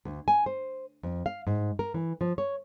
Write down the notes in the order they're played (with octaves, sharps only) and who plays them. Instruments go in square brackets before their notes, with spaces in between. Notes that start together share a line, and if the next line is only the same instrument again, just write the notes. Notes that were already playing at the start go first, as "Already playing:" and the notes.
[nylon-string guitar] D2
G#5
C5
F2
F5
G#2
A#4
E3
F3
C#5